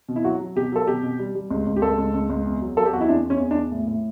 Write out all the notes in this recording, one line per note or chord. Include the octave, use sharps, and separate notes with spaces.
B2
E4
F#3 F#4
F#3
B2 G4
F#3 A4
B2 G4
B2
G3
G3
C#2
C#2
G4
C#2 A4
C#2
C#2
C#2
E2
F#3
F#3 A4
G4
E2 F#4
E4
E2 D4
E2
C#4
E2
D4
E2
A2
A2